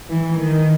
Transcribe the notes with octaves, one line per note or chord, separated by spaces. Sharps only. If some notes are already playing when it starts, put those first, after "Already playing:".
E3
D#3